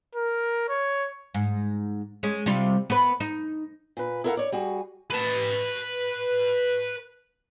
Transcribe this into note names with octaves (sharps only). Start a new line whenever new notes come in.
A#4
C#5
G#2
G#3 C#4
C3 G3 F4
B3 B4
D#4
A#2 B4
E4 A4 A#4 D#5 F5 F#5
C#5 D5
G3 F#4 G#4
B4 A5